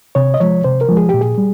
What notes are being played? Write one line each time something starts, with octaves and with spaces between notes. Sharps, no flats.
C3 C#5
D#5
F3 G#3 C#5
C3 C5
A#4
F3 G#3
G#4
A#2 G4
G#4
G3